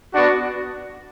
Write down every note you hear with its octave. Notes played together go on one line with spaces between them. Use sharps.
B3 D4 F#4